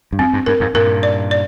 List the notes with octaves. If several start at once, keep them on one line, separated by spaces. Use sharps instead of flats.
G2
F2 C4
G2
G2 A#4
F2 G#2
G2 A#2 A#4
D5
D5